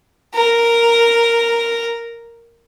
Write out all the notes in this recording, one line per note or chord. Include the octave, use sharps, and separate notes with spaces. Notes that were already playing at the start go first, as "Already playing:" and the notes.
A#4